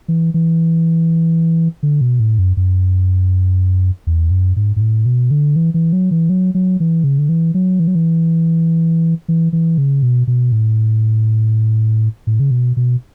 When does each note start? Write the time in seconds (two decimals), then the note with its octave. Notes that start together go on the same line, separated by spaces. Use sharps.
0.08 E3
0.34 E3
1.83 D3
2.01 B2
2.20 A2
2.39 F#2
2.57 F#2
4.07 E2
4.31 F#2
4.56 G#2
4.76 G#2
4.81 A2
5.06 B2
5.31 D3
5.56 E3
5.74 E3
5.93 F#3
6.11 E3
6.30 F#3
6.55 F#3
6.80 E3
7.04 C#3
7.19 D3
7.29 E3
7.54 F#3
7.80 E3
7.88 F#3
7.95 E3
9.28 E3
9.53 E3
9.78 C#3
10.03 B2
10.27 B2
10.52 A2
12.27 A2
12.40 C#3
12.51 B2
12.77 B2